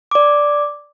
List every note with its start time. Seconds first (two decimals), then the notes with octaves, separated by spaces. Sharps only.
0.11 D5 D6